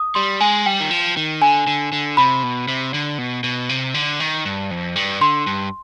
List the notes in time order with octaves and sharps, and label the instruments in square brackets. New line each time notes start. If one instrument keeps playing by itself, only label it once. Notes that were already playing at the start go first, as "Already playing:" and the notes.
Already playing: [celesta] D#6
[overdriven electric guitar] G3 [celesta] C6
[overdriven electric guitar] G#3 [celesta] G#5
[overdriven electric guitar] G3 [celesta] G5
[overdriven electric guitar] D#3
F3
D#3
[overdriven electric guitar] D3 [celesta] G#5
[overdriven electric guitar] D3
D3
[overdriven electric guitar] C3 [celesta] B5
[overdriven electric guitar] B2
C3
D3
B2
B2
C3
D3
D#3
G2
F2
G2
[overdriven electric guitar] D3 [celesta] C6
[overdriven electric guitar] G2